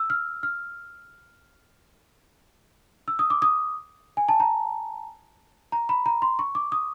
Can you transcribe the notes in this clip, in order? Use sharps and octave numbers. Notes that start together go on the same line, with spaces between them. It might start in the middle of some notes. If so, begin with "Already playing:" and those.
Already playing: E6
F6
F6
E6
D#6
D6
D#6
G#5
A5
A#5
A#5
B5
A#5
C6
C#6
D6
D#6